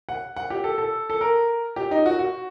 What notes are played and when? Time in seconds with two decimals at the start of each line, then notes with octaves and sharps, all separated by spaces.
0.09 F#5
0.36 F#5
0.50 G4
0.64 A4
0.78 A4
1.10 A4
1.21 A#4
1.76 G4
1.91 D#4
2.06 F#4
2.19 F#4